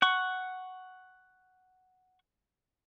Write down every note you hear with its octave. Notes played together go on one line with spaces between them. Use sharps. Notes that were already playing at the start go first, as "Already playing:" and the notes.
F#5 C#6